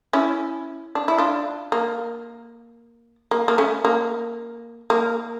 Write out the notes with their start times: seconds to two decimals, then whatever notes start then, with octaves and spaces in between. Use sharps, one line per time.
0.13 C#4 E4
0.95 D4
1.08 E4
1.18 D4 F4
1.72 A#3
3.31 A#3
3.48 A#3
3.58 A3 C#4
3.85 A#3
4.90 A#3